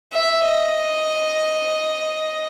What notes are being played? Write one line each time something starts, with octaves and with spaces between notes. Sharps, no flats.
E5
D#5